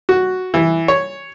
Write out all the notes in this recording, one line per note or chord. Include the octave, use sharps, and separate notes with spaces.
F#4
E3
C#5